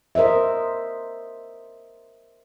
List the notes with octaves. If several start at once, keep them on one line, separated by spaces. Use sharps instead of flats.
A#4 C5 D#5 E5